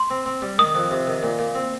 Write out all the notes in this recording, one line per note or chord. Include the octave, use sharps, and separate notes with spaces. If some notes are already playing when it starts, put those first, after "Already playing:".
Already playing: C6
C4
C4
G3
D#3 D#6
F2
C3
D#3
A#2
A#2
C4